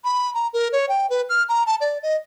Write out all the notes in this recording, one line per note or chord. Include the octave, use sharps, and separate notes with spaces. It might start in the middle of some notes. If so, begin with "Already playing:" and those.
B5
A#5
A#4
C#5
G5
B4
F6
A#5
A5
D5
D#5